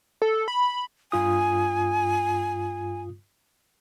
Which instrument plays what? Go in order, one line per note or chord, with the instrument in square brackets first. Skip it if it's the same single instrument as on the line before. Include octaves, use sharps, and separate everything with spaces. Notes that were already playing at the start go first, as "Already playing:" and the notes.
[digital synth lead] A4
B5
[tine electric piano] G2 F4 D#6 [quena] G#5